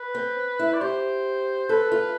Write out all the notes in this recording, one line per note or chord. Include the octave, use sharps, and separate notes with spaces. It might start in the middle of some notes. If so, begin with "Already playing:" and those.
Already playing: B4
C4
E4
D5
G4 C5
A4 B4
F4